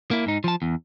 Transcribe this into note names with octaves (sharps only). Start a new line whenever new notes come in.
A#3 E4
G#2 D#4
F3 A5
E2